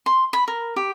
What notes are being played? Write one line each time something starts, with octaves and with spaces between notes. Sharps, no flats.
C6
B5
A#4
G4